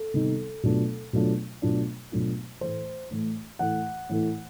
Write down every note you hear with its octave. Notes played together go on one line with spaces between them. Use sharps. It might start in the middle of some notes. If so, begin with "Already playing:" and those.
Already playing: A4
C3 D#3 G3 B3 D#4
B2 F#3 A3 D4 F4
B2 F#3 A3 D4 F4
B2 F#3 A3 D4 F4
B2 F#3 A3 D4 F4
A2 E3 A3 C5
A2 E3 A3
A2 E3 A3 F#5
A2 E3 A3